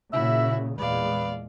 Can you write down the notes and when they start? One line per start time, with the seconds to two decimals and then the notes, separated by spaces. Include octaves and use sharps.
0.13 A#2 C#3 E4 F#4 E5
0.78 E2 A#2 G#3 B4 D5 F5